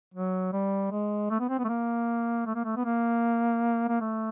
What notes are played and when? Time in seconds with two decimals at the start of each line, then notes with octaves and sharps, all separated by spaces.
0.14 F#3
0.53 G3
0.92 G#3
1.30 A3
1.40 B3
1.49 C4
1.59 B3
1.64 A3
1.69 A#3
2.46 A3
2.55 A#3
2.65 A3
2.76 B3
2.85 A#3
3.89 A#3
4.01 A3